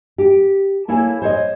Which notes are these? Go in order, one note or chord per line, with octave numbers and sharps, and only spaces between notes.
G4
A#3 E4 A4 C#5 G#5
C5 C#5 D#5